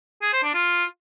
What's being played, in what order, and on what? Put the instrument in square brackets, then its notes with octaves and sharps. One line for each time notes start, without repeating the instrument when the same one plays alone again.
[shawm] G#4
C5
D4
F4